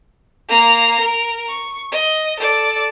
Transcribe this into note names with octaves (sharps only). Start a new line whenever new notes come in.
A#3 A#5
A#4
C#6
D#5
A4 D5